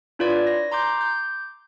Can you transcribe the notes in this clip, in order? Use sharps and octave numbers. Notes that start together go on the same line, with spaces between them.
D4 E4 F4 B4 C#5 D5
A#6
A#5 C6 D6 G6
D6 G6